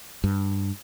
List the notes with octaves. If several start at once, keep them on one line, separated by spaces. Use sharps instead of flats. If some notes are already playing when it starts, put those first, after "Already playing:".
G2